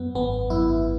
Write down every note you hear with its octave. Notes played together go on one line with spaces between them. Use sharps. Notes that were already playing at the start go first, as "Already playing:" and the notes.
Already playing: F#2 B3
G#1 B3
F#2 E4